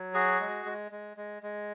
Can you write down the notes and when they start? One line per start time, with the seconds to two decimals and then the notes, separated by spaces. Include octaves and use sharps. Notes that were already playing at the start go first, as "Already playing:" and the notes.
Already playing: F#3
0.14 F#4 G#4
0.40 G#3
0.66 G#3
0.92 G#3
1.17 G#3
1.43 G#3